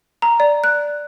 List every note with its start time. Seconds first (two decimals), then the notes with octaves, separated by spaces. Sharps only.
0.22 A#5
0.40 D5
0.64 F#6